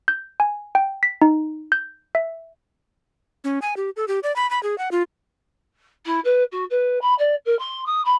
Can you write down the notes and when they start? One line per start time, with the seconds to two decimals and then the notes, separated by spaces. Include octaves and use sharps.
0.08 G6
0.40 G#5
0.75 G5
1.03 B6
1.22 D#4
1.72 G6
2.15 E5
3.44 C#4
3.62 G#5
3.77 G4
3.97 A4
4.08 G4
4.23 D5
4.36 B5
4.51 B5
4.63 G#4
4.78 F#5
4.92 F4
6.06 E4
6.25 B4
6.52 F#4
6.70 B4
7.01 B5
7.19 D5
7.45 A#4
7.59 C6
7.86 D#6
8.05 B5